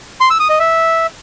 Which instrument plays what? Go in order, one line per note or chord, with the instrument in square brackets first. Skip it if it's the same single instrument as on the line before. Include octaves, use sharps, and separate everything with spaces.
[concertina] C6
E6
D#6
D#5
E5